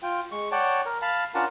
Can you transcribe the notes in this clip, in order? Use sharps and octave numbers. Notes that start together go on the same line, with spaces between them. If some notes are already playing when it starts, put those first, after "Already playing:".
F4 G5
G#3 C#6
C#5 D5 F#5 G5 A5
A#4
F5 A5 B5
C#4 D4 F4 A#4 F#5 A5